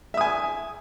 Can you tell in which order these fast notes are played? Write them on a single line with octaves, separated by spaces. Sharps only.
E5 D#6 G#5